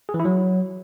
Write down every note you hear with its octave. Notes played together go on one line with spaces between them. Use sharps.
G#4
E3
E4
F#3